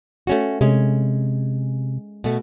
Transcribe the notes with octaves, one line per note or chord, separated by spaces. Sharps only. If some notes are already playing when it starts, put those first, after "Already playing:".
A3 C#4 F#4
C3 G#3 C#4
B2 A3